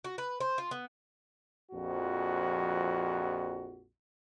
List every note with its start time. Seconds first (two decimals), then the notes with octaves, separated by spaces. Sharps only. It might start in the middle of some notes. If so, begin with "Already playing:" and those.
0.04 F#4
0.18 B4
0.40 C5
0.58 F4
0.71 B3
1.71 A#1 F2 F#4